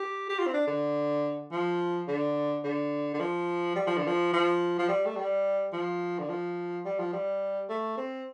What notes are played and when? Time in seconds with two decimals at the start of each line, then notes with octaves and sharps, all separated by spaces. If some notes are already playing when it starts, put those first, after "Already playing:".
Already playing: G4
0.29 G4
0.39 F4
0.47 C4
0.53 D4
0.67 D3
1.52 F3
2.08 D3
2.64 D3
3.14 D3
3.20 F3
3.76 G3
3.87 F3
3.97 D3
4.07 F3
4.33 F3
4.79 F3
4.89 G3
5.06 A3
5.16 G3
5.73 F3
6.19 D3
6.29 F3
6.85 G3
6.99 F3
7.13 G3
7.69 A3
7.97 C4